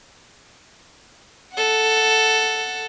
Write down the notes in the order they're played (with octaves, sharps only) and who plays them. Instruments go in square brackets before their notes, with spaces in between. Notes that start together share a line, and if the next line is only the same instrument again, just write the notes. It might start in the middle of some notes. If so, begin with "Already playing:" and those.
[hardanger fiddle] A4 F#5